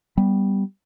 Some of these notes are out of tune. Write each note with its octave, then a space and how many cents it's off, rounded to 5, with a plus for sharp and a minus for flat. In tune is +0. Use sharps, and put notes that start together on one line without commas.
G3 +0 B3 +0